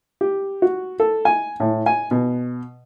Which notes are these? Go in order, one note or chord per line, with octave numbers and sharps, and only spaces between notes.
G4
F#4
A4
G#5
A2
G#5
B2